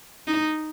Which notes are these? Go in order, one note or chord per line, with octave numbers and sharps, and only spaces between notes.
D#4